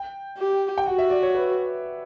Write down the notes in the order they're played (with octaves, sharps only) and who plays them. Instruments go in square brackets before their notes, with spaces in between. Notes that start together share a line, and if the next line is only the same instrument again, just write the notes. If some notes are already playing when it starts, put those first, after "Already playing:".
Already playing: [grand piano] G5
[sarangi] G4
[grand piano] G5
[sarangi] F#4 [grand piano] F#5
[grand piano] E5
D5
C#5
B4